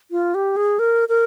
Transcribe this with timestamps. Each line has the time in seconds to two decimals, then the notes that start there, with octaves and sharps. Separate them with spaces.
0.11 F4
0.35 G4
0.56 G#4
0.79 A#4
1.09 A#4